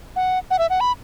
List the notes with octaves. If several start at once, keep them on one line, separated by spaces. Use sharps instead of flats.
F#5
F#5
E5
F#5
B5